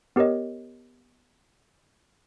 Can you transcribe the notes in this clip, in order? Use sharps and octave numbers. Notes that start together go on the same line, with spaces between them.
B3 G4 A#4 C#5 D#5